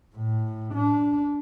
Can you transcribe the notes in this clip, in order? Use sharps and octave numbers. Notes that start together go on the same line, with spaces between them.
A2
D4